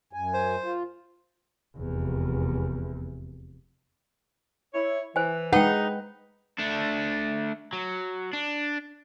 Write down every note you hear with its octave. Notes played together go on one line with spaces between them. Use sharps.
F#2 G#5
C5
F4
F1 E2
E4 C#5
E3 C5 G#5
G#3 D#4 B4 F#5 G5
A3 D4
F#3
D4